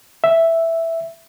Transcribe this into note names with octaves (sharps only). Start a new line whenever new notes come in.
E5